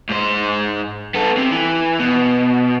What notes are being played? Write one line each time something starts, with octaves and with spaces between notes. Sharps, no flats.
G#2 C5
B3 A4
C3 C4
E3
B2